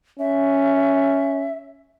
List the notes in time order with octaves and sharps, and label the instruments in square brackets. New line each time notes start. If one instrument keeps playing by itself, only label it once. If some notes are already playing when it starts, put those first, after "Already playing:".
[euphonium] C#4 [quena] E5